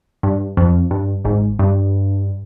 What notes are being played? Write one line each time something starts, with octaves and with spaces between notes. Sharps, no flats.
G2
F2
G2
G#1 G#2
G2